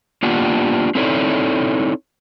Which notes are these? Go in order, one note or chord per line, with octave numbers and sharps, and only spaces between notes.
A#3 B3 D4 F4 G4 F#5
C4 D#4 E4 A4 C#5 D5